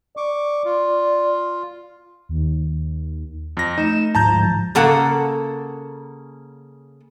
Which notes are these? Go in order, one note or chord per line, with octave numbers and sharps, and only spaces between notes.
D5 C#6 D6
F4
D#2
F2 A#6
A3 D#4 E7
D2 G#2 F3 A5 A#5 G6
C#3 A#3 A4 F#5